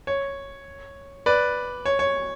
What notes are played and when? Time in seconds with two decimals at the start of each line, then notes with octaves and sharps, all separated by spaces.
0.07 C#5
1.26 B4 D5
1.86 C#5
1.99 C#5